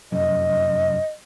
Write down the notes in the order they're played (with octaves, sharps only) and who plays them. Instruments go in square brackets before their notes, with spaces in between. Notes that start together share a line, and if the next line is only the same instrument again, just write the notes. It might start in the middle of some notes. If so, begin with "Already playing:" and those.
[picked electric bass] F1 F#2 [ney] D#5